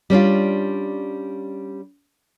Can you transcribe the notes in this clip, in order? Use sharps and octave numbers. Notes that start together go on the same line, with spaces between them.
G3 C#4 D4 F4